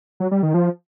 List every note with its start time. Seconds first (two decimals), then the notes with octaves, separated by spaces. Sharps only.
0.20 F#3
0.31 G3
0.43 D#3
0.54 F3